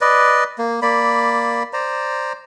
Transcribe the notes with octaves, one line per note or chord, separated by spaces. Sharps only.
B4 D5 D#5
A#3
A#3 D5 B5
C5 D5 A#5